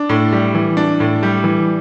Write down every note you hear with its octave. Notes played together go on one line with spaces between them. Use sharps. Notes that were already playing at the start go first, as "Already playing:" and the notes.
Already playing: D4
A2
G3
E3
D4
A2
G3
E3